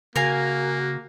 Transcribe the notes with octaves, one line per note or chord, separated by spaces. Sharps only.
C#3 A#3 F#4 A#4 F5 G#5